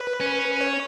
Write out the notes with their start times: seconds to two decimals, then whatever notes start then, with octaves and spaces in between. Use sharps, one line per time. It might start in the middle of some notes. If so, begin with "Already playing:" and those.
Already playing: B4
0.21 C#4
0.61 C#5